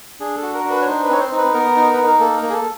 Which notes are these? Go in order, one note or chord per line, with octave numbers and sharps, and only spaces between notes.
D4 G#4
A4
F#4
A#4
D4
B4
C#5
D#4 C5
B4
C4 C#5
C5
D#4
B4
B3 A#4
D#4
B4
D#4
A#4
A#3 A4
A#4
A#3
G#4
A4